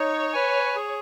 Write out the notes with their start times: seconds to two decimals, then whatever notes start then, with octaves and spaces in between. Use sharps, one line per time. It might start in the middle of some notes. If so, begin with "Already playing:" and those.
Already playing: D#4 C#5
0.33 B4 G#5
0.76 G#4